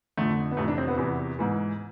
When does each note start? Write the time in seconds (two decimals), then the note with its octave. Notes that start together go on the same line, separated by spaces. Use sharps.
0.17 F2 D3 A3
0.51 B3
0.57 F2 C3 E3 A3
0.68 D4
0.78 C4
0.88 B3
0.97 E2 C3 E3
1.39 G#2 E3